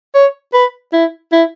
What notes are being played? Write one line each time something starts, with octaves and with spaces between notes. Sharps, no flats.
C#5
B4
E4
E4